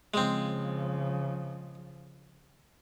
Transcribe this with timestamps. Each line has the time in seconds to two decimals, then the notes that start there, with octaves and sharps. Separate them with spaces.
0.14 C#3 F3 G#3 C4